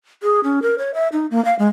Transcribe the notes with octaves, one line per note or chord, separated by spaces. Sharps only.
G#4
C#4
A#4
C#5
E5
D#4
A#3
F5
G#3